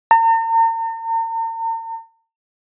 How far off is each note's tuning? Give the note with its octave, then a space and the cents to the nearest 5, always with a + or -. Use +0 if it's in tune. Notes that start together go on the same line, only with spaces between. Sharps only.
A#5 -45